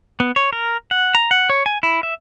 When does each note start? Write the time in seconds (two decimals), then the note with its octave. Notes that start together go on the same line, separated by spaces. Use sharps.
0.20 B3
0.36 C#5
0.53 A#4
0.91 F#5
1.15 A#5
1.31 F#5
1.50 C#5
1.66 G#5
1.83 E4
2.03 E5